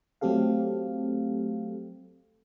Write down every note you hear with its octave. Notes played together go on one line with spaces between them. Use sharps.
F#3 A3 C4 G4 A4 F5